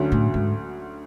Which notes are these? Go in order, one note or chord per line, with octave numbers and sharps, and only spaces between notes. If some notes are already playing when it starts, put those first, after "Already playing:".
Already playing: D2 D3 F#3 C#4
A2
G#2